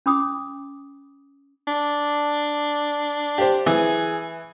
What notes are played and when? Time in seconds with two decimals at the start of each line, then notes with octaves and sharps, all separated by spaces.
0.06 C#4 B5 D6 D#6
1.68 D4
3.38 G4 C5
3.66 E3 G#4